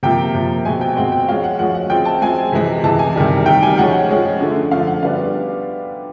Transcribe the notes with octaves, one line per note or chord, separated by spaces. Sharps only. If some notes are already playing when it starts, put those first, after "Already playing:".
C3 F3 A#3 G5
C3 F3 A#3
B2 G#3 C4 G#5
G5
B2 G#3 C4 F#5
G5
F3 G#3 C#4 F5
F#5
F3 G#3 C#4 F#5
F#5
F3 G#3 C4 G5
A5
F3 G#3 C4 G#5
C3 E3 G#3
C3 E3 G#3 A5
G#5
C3 D#3 G3
C3 D#3 G3 G5
G#5
F3 G#3 C#4 F#5
F#5
F3 G#3 C#4
D3 F3 A3
D3 F3 A3 F5
F#5
D3 G3 B3 D4 F5